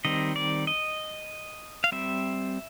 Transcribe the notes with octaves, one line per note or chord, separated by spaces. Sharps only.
D#3 G3 C4 D#5
D5
D#5
F5
G3 C4 E5